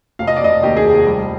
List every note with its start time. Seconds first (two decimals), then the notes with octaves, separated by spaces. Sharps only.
0.19 F1 F5
0.27 D#5
0.37 D5
0.42 F1 D#5
0.62 D#2 G4
0.77 G#4
0.84 F1
1.06 G3